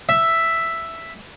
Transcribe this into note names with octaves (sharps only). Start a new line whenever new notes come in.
E5